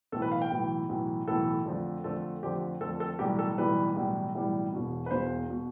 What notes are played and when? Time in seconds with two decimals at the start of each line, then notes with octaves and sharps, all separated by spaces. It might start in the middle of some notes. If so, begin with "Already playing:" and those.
0.12 B1 A2 E3 A4
0.22 B4
0.32 F5
0.42 G5
0.51 B1 A2 E3
0.89 B1 A2 E3
1.27 B1 A2 E3 A4
1.66 F2 D3 F3 A3
2.04 F2 D3 F3 A3 A4
2.43 F2 D3 F3 A3 G4
2.81 F2 D3 F3 A3 A4
3.00 A4
3.19 B1 A2 E3 G3 G4
3.39 A4
3.58 B1 A2 E3 G3 B4
3.96 B1 A2 E3 G3
4.34 B1 A2 E3 G3
4.73 E1 E2 B2
5.06 B4
5.11 E1 E2 B2 C5
5.50 B2